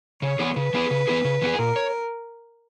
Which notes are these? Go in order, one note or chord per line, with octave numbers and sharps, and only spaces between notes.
C#3 C#5
E3 B3 E4 G#4
C#3 B4
E3 B3 E4 G#4
C#3
E3 B3 E4 G#4
C#3
E3 B3 E4 G#4
A#2 A#4
C#5